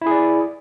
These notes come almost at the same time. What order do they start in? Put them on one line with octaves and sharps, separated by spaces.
E4 G#4 D5